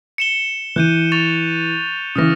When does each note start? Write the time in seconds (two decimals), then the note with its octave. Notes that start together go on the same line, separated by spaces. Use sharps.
0.18 C#7 E7 G7
0.76 E3 F#6 G6 D#7
1.12 C#6 A6 F7
2.16 C#3 E3 D#6 F6 A#6